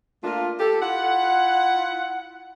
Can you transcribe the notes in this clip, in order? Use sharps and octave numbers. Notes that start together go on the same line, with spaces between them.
A3 A#3 D4 F4
G4 A4
E4 F4 F#5